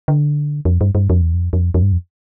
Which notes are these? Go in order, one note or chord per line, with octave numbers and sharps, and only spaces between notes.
D3
F2
G2
G2
F2
E2
F2
F2
F2
G2
F2